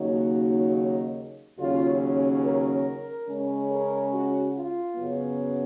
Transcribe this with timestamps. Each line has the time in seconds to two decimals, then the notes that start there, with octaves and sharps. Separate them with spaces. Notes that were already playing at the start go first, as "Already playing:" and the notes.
Already playing: D#2 C#3 F#3 A#3 D#4 F#4
1.58 D#2 C#3 F#3 C#4 F4
2.43 A#4
3.28 C#3 G#3 C#4
3.70 A#4
4.12 F#4
4.55 F4
4.96 F#2 C#3 F#3 B3